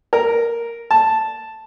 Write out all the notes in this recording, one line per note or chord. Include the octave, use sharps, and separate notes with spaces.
A#4
A5